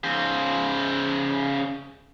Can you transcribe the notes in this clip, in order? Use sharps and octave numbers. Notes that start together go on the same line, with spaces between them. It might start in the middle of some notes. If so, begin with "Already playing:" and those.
C#3 C5